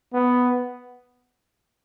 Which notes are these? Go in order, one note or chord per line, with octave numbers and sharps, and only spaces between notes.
B3